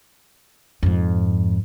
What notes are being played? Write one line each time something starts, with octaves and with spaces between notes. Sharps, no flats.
F2 G#2